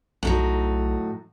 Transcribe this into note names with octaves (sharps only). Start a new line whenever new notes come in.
B1 A2 F#3 D#4